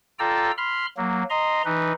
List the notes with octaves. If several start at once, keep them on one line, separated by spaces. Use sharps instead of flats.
F4 A4 D5 G5 A#5 E6
B5 C6 F6
F#3 A#3
D#5 A#5 C6
E3 D#4 B4